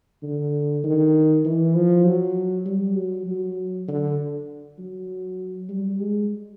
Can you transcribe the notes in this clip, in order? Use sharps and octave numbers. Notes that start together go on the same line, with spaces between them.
D3
D#3
E3
F3
F#3
G3
F#3
F#3
D3
F#3
G3
G#3